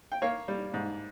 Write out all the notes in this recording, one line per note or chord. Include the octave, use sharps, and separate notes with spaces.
G5
A#3 C#5 F5
G3
G#2